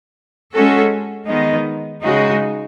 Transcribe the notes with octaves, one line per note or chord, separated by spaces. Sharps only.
G#3 C#4 F#4 A4
D#3 G#3 B3 D#4
C#3 G#3 D#4 F#4